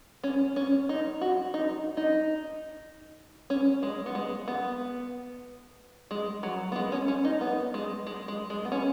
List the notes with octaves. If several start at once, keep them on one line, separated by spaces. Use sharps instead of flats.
C#4
C#4
D#4
F#4
D#4
D#4
C#4
G#3
B3
G#3
B3
G#3
F#3
B3
G#3
C#4
C#4
D#4
B3
G#3
G#3
G#3
G#3
B3
C#4